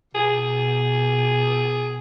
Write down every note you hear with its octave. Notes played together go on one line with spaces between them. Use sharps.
B2 G#4